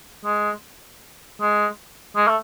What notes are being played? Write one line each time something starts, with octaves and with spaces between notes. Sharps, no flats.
G#3
G#3
G#3
A3